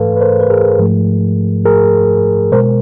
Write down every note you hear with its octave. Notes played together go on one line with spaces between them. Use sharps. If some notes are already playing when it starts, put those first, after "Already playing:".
Already playing: G#2 E3 A3 A4 B4 F5
B4
A#4 C5
B4
G#4 A#4
G#2 F3 A3
G#4 A#4
B2 G#3 A#4 C5